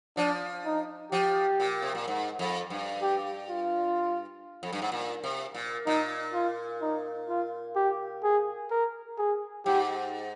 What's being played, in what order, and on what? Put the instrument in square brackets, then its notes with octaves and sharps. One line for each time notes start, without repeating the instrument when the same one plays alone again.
[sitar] F3 [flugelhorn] D4
[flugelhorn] D#4
[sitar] F3 [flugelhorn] G4
[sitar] A#2
C3
A#2
G#2
F2
G2
[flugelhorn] G4
F4
[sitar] F2
G2
G#2
A#2
C3
A#2
[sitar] A#2 [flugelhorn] D#4
[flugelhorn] F4
D#4
F4
G4
G#4
A#4
G#4
[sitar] G#2 [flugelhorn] G4